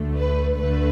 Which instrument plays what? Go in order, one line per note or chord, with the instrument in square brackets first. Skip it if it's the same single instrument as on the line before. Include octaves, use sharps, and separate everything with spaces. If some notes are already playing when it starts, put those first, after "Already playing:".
Already playing: [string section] D2 D3 A3
B4
D2 D3 A3 B4